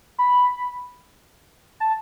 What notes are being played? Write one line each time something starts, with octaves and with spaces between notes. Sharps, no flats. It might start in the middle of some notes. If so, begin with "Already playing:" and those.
B5
A5